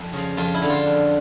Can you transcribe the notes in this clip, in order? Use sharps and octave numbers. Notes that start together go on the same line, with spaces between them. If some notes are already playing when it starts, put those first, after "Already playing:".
Already playing: F2
C#3 F3
F2 F4
E4
D3 F3
F4
F2